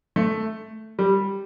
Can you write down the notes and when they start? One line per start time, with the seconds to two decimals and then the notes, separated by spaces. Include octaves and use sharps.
0.16 A3
0.99 G3